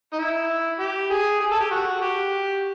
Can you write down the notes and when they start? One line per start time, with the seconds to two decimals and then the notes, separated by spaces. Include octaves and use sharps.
0.13 D#4
0.19 E4
0.79 G4
1.10 G#4
1.40 G#4
1.51 A4
1.60 G4
1.71 F#4
2.01 G4